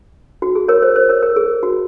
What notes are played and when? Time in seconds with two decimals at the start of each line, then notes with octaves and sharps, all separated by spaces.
0.42 F#4
0.55 G#4
0.68 A#4 C#5
0.82 C5
0.96 C5
1.09 A#4 C#5
1.23 A#4
1.36 G#4
1.63 F#4